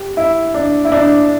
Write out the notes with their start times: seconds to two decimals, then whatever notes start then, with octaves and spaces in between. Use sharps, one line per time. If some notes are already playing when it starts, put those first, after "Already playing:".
Already playing: G4
0.17 E4
0.54 D4
0.85 E4
0.92 D4